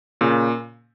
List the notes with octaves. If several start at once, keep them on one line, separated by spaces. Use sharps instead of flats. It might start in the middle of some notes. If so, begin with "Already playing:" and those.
A#2 C#3